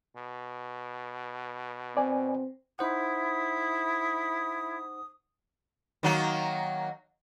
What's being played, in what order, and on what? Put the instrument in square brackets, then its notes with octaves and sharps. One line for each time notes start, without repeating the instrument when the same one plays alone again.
[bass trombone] B2
[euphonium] C4 [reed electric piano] D5 G#5
[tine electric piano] D#4 C5 F#5 [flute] E4 [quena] D#6
[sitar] D#3 F#3 A#3